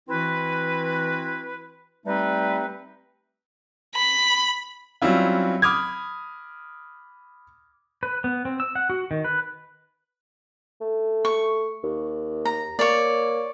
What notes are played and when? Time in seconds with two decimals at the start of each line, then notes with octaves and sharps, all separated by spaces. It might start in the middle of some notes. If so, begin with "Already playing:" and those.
0.09 E3 C4 E4 F#4 B4
2.06 G3 A3 C4 D#4 G4 B4
3.95 B5
5.02 F#3 G3 C4 C#4 E4 F4
5.62 B5 D6 D#6 F6 G#6
8.03 B4
8.24 B3
8.45 C4
8.60 E6
8.75 F#5
8.90 F#4
9.11 D#3
9.24 B4
10.81 A3
11.25 C#6
11.84 D#2
12.45 A#5
12.79 A#3 C#5 D5